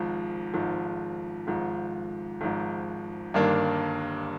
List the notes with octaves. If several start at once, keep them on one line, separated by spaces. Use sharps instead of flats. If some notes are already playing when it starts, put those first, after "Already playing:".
Already playing: G#1 G#2 F3
G#1 G#2 F3
G#1 G#2 F3
G#1 G#2 F3
G1 G2 D#3 A#3 D4